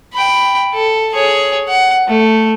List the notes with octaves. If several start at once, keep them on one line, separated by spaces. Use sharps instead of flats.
G5 B5
A4
G#4 C#5
F#5
A3